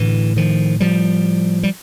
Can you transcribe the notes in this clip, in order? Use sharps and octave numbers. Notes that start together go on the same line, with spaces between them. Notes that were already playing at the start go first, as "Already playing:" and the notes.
Already playing: A2 D3 E3
D#3 F3
F3 G3
G3